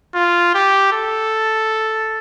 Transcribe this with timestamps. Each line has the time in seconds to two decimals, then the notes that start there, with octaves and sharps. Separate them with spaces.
0.14 F4
0.54 G4
0.92 A4